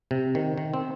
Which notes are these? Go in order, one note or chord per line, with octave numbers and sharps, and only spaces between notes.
C3
D#3
D#3
C4